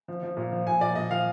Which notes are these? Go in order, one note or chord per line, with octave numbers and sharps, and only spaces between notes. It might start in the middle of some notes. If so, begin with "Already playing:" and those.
F3
F3
A#2
F3
A#2 G#5
A#2 D5
A#2 D#5
F3 F5